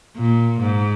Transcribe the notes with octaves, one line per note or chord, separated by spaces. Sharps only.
A#2
G#2